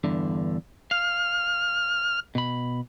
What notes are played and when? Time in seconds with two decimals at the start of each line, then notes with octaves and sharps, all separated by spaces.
0.04 E2 G2 D3
0.91 F5 F6
2.35 B2 B5